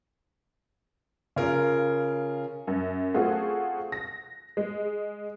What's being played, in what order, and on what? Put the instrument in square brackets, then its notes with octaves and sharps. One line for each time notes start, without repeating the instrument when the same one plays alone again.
[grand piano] C#3 F4 A#4
[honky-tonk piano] F#2
A3 C4 F4 F#4 G#4
A#6
G#3